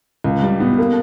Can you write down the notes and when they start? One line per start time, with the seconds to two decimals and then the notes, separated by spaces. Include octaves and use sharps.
0.24 C#2
0.43 G3
0.60 B3
0.78 A#3